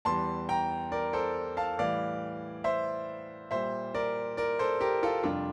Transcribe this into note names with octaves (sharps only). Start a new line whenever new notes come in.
E2 E3 G3 A5 C6
G5 A#5
A#4 D5
A4 C5
F5 A5
A2 E3 G3 D5 F5
C5 E5
A#2 G3 C5 E5
A#4 D5
A#4 D5
A4 C5
G4 A#4
F4 A4
F2 C3 G3 D4 F4